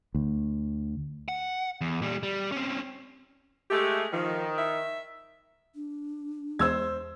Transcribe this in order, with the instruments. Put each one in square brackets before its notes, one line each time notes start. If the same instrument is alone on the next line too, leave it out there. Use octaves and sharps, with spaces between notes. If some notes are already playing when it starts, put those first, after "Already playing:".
[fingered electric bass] D2
[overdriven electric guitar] F#5
E2
A#2 G3
G3
C4 C#4
[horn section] G#3 A3 [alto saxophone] G4
[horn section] D#3 [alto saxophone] F3
[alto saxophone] E5
[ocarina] D4
[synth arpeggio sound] E2 G#3 [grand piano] C5 E6 G#6